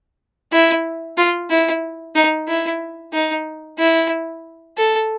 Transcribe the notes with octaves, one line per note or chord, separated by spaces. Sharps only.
E4
F4
E4
D#4
E4
D#4
E4
A4